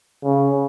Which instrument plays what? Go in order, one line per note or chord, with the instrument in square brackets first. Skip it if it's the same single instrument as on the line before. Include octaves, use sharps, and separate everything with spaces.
[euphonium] C#3